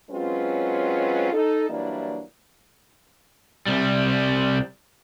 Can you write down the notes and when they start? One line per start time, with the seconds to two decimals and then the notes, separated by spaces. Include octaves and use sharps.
0.11 F#3 G#3 C4 C#4 F4 B4
1.32 D#4 A4
1.70 E3 F#3 G3 A#3 D4 E4
3.67 C2 G3